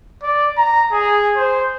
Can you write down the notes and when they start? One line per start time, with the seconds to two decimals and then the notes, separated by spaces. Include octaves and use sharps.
0.22 D5
0.57 A#5
0.92 G#4
1.36 C5